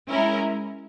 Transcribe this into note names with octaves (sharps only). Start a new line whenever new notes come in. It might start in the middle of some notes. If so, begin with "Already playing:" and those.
G#3 C#4 E4 A#4